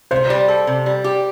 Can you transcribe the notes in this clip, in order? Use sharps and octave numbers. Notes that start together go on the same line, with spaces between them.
C3 C5
G3
A4
C3
G3
G4